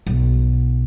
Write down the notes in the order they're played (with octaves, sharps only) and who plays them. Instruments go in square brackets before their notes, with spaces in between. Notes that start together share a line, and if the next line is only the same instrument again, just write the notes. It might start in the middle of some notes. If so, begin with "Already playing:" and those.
[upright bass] B1